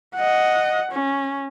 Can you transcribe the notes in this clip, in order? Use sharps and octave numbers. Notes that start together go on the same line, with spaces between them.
D#5 F#5
C#4